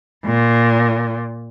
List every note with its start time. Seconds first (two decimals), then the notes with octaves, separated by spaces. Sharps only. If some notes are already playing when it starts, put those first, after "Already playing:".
0.25 A#2